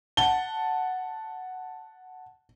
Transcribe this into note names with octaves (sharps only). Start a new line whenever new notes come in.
F#5 A5 G7